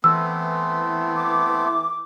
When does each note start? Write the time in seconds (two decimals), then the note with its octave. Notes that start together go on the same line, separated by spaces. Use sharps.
0.04 E3 A3 B3 C4 E6
1.15 D6